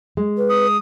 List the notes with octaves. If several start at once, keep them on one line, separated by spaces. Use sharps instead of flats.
G#3
B4
D#6